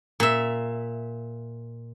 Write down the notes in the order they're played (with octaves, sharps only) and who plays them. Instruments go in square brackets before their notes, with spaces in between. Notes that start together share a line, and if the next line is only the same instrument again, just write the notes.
[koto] A#2 E5